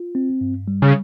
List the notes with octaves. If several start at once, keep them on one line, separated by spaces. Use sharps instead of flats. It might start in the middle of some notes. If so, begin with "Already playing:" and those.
Already playing: F4
C4
G2
G3
C#3